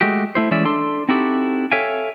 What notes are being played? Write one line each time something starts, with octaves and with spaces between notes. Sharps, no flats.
G#3 A3 F#4 G4
A3 E4 C5
E3 G#3 C#4 D5 E5
D4 A4 C6
C4 D#4 E4 F#4 G4 A4
A4 C#5 E5 F5 G5 G#5